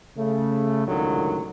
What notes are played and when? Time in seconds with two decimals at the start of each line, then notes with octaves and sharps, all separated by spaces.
0.18 C#3 A3
0.87 C#2 A2 D3 D#3 F#3